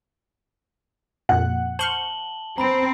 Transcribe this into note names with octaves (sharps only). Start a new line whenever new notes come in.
F2 A#2 F#5
C5 A5 C#6 F6 F#7 G7
C4 A#5 B5 D7